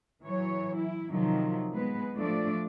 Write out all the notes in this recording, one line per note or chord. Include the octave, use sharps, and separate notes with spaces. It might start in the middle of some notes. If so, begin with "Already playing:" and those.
E3 F#3 C#5
E4
C3 D#3 F3 F#3
G#3 B3 B4
F3 A3 D4 D5